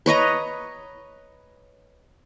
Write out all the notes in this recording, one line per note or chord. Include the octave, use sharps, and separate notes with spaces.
B4 C#5 D#5 A#5